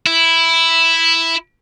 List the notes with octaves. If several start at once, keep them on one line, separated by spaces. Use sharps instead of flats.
E4